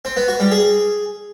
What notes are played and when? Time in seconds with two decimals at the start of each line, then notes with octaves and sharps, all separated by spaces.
0.05 C4
0.17 B3
0.28 F#4
0.40 G3
0.51 G#4